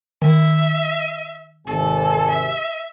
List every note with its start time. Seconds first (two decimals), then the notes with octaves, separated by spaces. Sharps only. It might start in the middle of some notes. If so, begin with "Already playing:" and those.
0.22 D#3 E5
1.67 G#1 C3 A4 G#5
2.30 E5